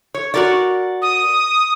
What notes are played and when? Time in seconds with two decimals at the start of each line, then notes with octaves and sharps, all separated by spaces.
0.14 C#5
0.34 F#4 A#4 D5
1.02 D#6